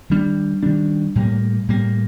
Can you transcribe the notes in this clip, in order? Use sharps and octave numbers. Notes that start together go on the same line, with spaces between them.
D#3 G3 D4
D#3 G3 D4
A2 G3 A#3
A2 G3 A#3